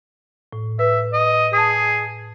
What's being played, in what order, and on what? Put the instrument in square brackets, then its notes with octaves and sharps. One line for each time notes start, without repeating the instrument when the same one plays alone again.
[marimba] A2
[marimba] B4 [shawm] E5
[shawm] D#5
[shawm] G#4 [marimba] A5 D#6